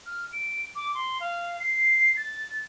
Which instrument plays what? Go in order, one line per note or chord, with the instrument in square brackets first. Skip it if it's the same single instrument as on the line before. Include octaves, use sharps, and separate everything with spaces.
[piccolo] F6
D7
D6
C6
F5
C7
A6